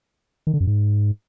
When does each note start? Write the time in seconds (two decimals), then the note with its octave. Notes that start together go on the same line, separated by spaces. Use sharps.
0.47 D#3
0.54 D3
0.60 F#2
0.67 G#2